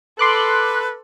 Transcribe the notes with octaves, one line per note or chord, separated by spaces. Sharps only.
A4 B4 C6 D6 F#6